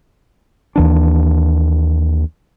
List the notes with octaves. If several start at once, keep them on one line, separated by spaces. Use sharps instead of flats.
D#2 E3 D4